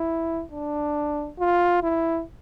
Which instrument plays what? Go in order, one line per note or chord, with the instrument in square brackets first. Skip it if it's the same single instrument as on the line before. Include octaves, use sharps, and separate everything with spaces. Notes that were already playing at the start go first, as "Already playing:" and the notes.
Already playing: [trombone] E4
D4
F4
E4